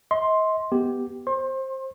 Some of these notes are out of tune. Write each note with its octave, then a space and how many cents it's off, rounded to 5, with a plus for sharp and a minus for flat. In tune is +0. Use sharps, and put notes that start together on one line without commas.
D#5 +40 C6 +5
B3 +0 G4 +0
C5 +20 C6 +35